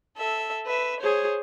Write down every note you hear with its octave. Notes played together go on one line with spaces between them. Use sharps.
A4 E5
B4 E5
G#4 C5 C#5